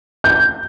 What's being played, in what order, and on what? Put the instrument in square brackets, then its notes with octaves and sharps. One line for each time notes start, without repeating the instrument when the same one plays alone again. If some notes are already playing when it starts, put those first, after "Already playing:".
[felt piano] G6